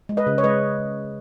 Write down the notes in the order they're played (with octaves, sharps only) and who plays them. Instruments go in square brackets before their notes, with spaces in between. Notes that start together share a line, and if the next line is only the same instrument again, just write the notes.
[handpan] G#3
B4 D#5
C#3
C#5
G#3 B4 D#5